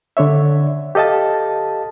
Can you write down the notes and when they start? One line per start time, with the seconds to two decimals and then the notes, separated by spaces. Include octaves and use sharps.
0.17 D3 D4 C#5 E5
0.95 G4 A4 D#5 F5 A5